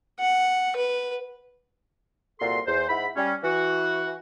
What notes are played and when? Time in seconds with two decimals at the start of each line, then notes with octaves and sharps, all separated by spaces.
0.19 F#5
0.76 B4
2.40 C2 A#2 F#4 A4 C6
2.67 E2 C5
2.89 G#2 E4 F#5 B5
3.17 G3 C#4
3.43 E3 F#4